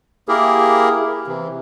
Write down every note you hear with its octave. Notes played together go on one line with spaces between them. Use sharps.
A#3 E4 G4 G#4 A#4
C3 E3